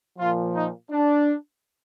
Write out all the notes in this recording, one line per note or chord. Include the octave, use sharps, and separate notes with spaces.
A#2 F3 F4
D#4
D4